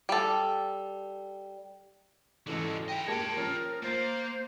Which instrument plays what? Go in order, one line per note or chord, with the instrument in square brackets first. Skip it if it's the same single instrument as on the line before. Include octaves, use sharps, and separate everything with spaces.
[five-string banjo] G3 A4
[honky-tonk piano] G#2 C#3 E3 [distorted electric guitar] G3 F#4 [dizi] A4
[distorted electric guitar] E4 D#5 [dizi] G5
[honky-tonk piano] G#3 A#3 G4 [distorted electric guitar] C#5 G5 [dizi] A5
[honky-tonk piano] F3 C#4 [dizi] A#4
[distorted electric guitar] A#3 [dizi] C5 [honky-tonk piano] A6 D7